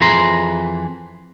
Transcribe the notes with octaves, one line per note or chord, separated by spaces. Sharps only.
F2 E3 G#4 A#5 C6